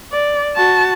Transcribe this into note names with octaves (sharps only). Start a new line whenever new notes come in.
D5
F#4 A5